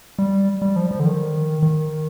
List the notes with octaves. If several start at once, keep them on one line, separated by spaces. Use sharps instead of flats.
G3
G3
F3
F3
D3
D#3
D#3